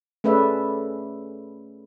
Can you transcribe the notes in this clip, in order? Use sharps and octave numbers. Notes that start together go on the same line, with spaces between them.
A3 C#4 G#4 B4 D5 E5